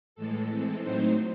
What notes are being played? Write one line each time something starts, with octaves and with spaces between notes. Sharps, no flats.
A2 E3 G#3 A4
E3 G#3 C4
A2 F#3 A3 C4 D#4 C5